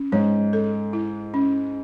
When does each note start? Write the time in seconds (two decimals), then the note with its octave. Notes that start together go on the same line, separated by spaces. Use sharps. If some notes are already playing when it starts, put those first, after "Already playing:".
Already playing: C#4
0.12 G#2 C#5
0.53 A4
0.93 E4
1.34 C#4